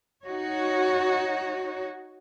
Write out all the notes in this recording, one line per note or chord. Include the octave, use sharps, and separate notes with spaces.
D#4 F#4 C#5